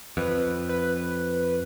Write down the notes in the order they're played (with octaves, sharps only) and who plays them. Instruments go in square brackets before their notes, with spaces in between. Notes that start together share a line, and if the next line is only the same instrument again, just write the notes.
[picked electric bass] F2 [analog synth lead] B4
[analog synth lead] B4